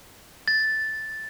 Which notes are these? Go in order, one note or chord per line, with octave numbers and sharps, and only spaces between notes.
A6